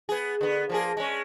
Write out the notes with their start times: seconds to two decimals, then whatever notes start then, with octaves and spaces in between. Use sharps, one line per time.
0.09 B3 G#4
0.41 D3 B3
0.69 F3 A#3 G#4
0.97 G#3 C#4